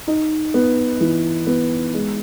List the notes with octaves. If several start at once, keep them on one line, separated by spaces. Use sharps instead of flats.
D#4
B3
E3
B3
G#3